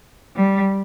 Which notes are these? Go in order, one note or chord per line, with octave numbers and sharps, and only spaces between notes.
G3